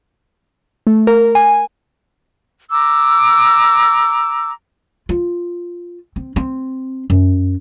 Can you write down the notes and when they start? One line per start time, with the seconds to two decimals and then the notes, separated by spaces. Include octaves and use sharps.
0.87 A3
1.07 A#4
1.35 G#5
2.70 A#5 D6 E6
5.09 F4
6.16 C4
6.36 C4
7.10 F#2